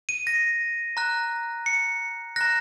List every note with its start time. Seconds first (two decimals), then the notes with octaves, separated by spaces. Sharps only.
0.09 D#7
0.27 A#6
0.97 A#5 F#6
1.66 C#7
2.36 A#5 F#6 A#6